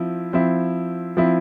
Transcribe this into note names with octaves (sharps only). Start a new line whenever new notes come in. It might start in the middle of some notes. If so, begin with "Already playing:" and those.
Already playing: F3 C4 E4
F3 C4 E4
F3 C4 E4